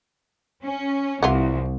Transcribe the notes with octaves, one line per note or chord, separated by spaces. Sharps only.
C#4
C2 E3 F4 F#5